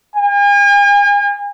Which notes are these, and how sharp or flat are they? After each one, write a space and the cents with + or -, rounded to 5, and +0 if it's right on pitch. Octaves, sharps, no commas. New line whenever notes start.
G#5 -45